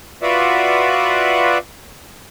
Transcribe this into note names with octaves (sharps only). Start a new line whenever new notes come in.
F4 F#4 B4 D5 E5 F#5